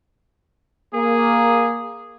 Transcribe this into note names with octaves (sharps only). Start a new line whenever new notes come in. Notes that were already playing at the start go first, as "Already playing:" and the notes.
A#3 G#4